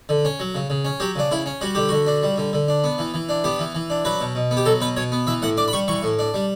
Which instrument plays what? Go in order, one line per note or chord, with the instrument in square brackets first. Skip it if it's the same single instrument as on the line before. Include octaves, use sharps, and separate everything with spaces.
[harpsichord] D3
C#4
F#3
C#3
C#3
C#4
F#3 G4
C#3 D4
C#3 E4
C#4
G3 F#4
D3 G4
D3 F#4
D4
G3
D3
D3
D4
B3
E3
E3
D4
B3 G4
E3
E3
D4
F#3 B4
B2
B2
B3
G4
F#3 A4
B2 B4
B2 C#5
B3
E3 E5
A2 F#5
D4 D6
B5
G3 C#6
E3 C#6
A2
D4
G3